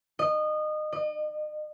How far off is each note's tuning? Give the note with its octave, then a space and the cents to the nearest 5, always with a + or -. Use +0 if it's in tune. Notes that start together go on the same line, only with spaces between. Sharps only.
D#5 -25
D#5 -40